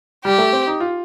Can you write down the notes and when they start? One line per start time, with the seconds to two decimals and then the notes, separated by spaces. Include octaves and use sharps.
0.25 G3 G4
0.38 A3
0.53 C4
0.67 D#4
0.80 F4